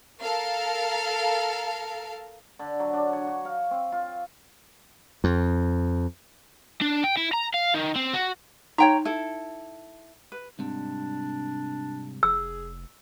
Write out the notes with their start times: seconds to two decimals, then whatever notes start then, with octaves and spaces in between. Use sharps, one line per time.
0.22 A4 A#4 F5
2.59 D3
2.80 F#3
2.93 D4
3.13 C#5
3.27 F#4
3.45 F5
3.71 C4
3.92 F4
5.24 F2
6.81 D4
7.04 G5
7.17 E4
7.33 A#5
7.54 F5
7.74 D#3
7.96 C4
8.13 F#4
8.78 D#4 C#5 G5 A#5
9.05 E4 A4
10.32 B4
10.59 C2 G#2 C3 D4
12.23 F1 G#4 E6